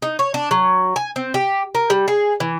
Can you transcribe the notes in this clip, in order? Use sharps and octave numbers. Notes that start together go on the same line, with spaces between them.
D#4
C#5
D4
F#3
G#5
C4
G4
A#4
G3
G#4
E3